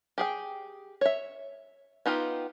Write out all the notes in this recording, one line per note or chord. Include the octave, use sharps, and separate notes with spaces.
G4 G#4 G5
C#5 E5
B3 D#4 F4 G4